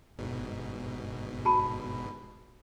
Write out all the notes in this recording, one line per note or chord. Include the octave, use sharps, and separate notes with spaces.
G1 G#2 B2
F#4 A5 B5